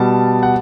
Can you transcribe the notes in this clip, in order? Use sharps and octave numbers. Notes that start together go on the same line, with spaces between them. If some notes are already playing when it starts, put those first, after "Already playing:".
Already playing: B2 G3 A5
F#5